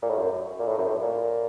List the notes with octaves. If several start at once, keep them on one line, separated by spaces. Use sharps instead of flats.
A#2
A2
F#2
A#2
A2
F#2
A2
A#2